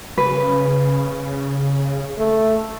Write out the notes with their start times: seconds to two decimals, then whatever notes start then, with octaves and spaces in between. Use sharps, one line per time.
0.18 C#3 B4
2.18 A3